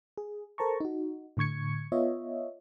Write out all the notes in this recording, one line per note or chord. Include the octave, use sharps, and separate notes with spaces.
G#4
A4 A#4 C5 A5 A#5 C#6
D#4 F#4
A2 D3 C#6 G#6 C#7
B3 F4 C#5 D#5 E5